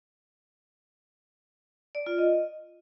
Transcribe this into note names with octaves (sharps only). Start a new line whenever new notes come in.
D5
F4
D#5